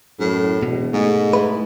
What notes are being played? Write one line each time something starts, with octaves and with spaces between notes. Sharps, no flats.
F#2 A2
E1 B2
G#2 A3
G#3 E4 B4